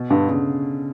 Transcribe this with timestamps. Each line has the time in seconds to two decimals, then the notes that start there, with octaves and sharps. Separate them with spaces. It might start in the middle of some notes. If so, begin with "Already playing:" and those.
Already playing: B2
0.10 G2 D3
0.29 C#3